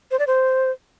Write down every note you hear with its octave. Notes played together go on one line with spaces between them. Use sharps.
C5
D5
C5